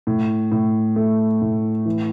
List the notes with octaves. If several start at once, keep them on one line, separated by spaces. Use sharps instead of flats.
A2
A2
A3
A2
E3